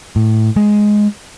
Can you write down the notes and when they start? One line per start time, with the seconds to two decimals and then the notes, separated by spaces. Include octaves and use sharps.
0.16 A2
0.56 G#3